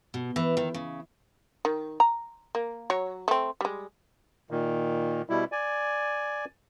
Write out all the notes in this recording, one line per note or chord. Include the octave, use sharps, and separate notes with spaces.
B2
E3
D#3
C#3
D#3
A#5
A#3
F#3 C#5
A3 C4
G3 G#3
A#2 D#3
B2 G3 E4
D5 G#5